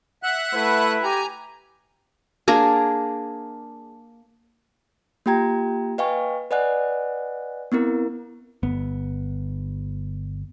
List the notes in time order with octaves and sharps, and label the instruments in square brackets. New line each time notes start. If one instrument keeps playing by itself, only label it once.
[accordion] E5 F#5 F#6
[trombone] A3 [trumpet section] E4 B4
[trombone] G4 [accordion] G#5 A#5
[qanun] A#3 D4 G#4
[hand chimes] A#3 F4 G4 G5 A#5 G#6
B4 D#5 F5 G5 G#5 C#6
B4 D5 D#5 F#5 G#5 F#6
B3 C4 E4 A#4
[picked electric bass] G1 B3